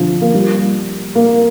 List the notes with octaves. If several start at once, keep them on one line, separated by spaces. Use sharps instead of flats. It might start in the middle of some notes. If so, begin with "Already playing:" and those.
Already playing: D3 F3
A#3
G3
A#3